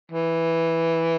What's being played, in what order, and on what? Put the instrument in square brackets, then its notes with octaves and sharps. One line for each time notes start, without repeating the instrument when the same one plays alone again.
[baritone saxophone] E3